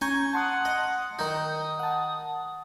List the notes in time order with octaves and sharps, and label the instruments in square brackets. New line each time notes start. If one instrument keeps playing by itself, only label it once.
[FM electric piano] C#4 A#5 G6 [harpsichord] G#5 C#6
[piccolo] F#5 [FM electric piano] A5 C6 D#6
[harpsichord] D#5
[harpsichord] D#3 D#4 [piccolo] D#6 [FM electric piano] G6
[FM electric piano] F#5 A5